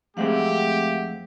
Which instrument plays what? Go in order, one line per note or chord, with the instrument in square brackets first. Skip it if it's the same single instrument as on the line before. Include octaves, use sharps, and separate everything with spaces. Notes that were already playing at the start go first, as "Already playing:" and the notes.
[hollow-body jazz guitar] F2 G#3 C4 [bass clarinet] A3 [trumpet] G4 [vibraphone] F5 F#5